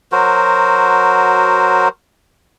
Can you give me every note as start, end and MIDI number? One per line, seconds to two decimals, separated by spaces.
0.12 1.88 54
0.12 1.88 66
0.12 1.88 70
0.12 1.88 72